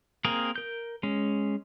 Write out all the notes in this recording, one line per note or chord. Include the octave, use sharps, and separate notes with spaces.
A#3 C4 G#4 A#4
A#4 G6
G#3 C#4